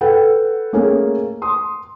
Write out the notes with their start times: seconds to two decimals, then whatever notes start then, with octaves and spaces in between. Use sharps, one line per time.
0.01 A4 B4 F#5 G5
0.73 A3 A#3 C#4 G#4 A#4
1.42 C6 D#6